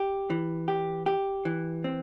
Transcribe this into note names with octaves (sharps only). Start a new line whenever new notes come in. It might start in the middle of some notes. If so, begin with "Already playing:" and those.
Already playing: G4
E3
G4
G4
E3
C4